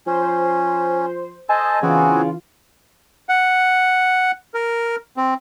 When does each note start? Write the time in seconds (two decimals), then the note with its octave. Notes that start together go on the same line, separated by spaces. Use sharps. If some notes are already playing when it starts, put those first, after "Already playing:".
0.07 F3 C#4 C5
1.49 A4 C5 D#5 G#5 A5
1.82 C#3 E3 B3 C4 F4 F#4
3.29 F#5
4.54 A#4
5.17 C4